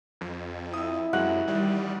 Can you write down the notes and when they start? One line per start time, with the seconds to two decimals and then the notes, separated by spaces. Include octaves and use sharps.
0.21 F2
0.74 E4 D#6 E6
1.13 F#2 C3 G#3 F#4 F#5
1.47 A1 D#3 G3